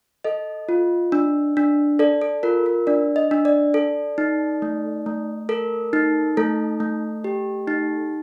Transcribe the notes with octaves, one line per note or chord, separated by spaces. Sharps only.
A4 D#5
F4
D4
D4
A4 D5
A4
F4 A#4
A#4
D4 D5
D#5
D4
D5
A4
D#4
A3
A3
A4 A#4
D#4
A3 A4
A3
G4
D#4